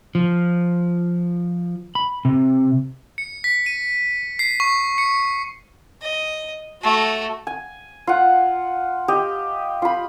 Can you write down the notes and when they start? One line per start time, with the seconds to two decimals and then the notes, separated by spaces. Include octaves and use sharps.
0.15 F3
1.95 B5
2.25 C3
3.18 C#7
3.44 B6
3.66 D#7
4.39 C7
4.60 C#6
4.98 C#7
6.02 D#5
6.82 A3 F#4
7.47 G#5
8.07 F4 F#5
9.08 G4 D#5
9.82 F4 B5